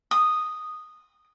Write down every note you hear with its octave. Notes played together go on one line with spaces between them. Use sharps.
D#6